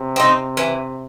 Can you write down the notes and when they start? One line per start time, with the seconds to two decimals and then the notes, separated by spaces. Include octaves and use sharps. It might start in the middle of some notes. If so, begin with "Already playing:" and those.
Already playing: C3
0.16 C4 D#4
0.57 E3